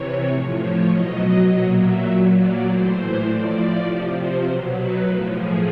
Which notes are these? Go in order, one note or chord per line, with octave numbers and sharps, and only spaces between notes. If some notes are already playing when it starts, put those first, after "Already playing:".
Already playing: C3 E3 C#5
A2 F3
C#5
B2 F#3 D#5
A#2 F#3
E5
A#2 F#3
D5
A2 E3 C5
A2 F3 D5
C3 F3
C5
B2 F#3
B4
A2 F3 A#4
G#4